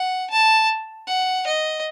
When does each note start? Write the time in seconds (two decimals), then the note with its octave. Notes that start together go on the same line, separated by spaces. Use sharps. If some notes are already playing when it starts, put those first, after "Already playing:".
Already playing: F#5
0.30 A5
1.08 F#5
1.47 D#5